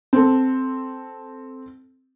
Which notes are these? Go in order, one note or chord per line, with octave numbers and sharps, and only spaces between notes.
C4 A4